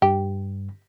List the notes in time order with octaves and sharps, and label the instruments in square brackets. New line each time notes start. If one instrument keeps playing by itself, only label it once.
[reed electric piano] G2 [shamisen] G4